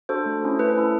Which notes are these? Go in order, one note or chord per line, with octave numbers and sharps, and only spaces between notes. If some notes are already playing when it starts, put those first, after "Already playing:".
D4 F#4 A4 C5
A3
C#4 E4 A4
A3 B4
C#4 E4 A4